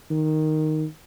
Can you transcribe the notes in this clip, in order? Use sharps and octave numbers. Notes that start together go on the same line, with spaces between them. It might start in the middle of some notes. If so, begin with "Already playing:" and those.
D#3